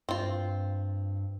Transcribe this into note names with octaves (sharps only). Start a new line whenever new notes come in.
G2 C4 F4